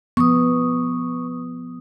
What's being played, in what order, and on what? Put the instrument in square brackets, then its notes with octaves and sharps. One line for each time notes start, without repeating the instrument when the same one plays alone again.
[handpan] F3 B3 [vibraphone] C#6 D#6